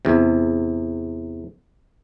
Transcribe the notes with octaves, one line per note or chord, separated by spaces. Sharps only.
E2 C3